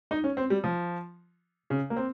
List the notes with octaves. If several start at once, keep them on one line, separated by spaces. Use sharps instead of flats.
D#4
C#4
C4
G3
F3
C#3
A#3
C4